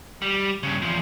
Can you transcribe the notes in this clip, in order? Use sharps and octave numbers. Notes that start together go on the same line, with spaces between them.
G3
G2 C#3
E2 F3